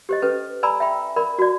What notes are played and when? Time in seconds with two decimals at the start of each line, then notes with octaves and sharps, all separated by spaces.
0.09 G4 C5 D#5
0.22 C#4 A4 B4
0.63 D5 G#5 A#5 B5 E6
0.80 E5 G5 B5
1.16 A#4 D5 B5
1.38 F#4 D5